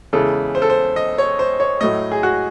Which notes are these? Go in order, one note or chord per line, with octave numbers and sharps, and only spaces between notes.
E2 C#3 E3 G#3 A4
C5
A4
C5
D#5
C#5
C5
C#5
A2 F#3 A3 D#5
G#4
F#4